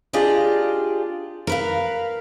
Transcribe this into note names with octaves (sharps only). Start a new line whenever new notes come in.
D4 F4 G4 G#4 D5 D#5
A#4 B4 F5